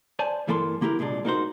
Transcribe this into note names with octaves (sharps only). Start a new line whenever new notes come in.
C5 D5 G#5 A5
G2 E3 A#3 A4 A#5 C6
D3 A#3 E4 G4 A#4
C2 A#2 G#3 C4 D4
A#3 D#4 F#4 C5